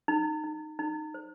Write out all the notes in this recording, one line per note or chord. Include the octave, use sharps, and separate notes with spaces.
D#4
D#4
D#4
C5